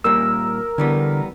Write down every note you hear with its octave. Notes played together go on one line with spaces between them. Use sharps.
A#2 G3 A#3 A#4 E6
D3 E3 G3 B3